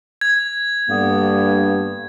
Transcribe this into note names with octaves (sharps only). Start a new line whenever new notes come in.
G#6
G2 D3 A#3 B3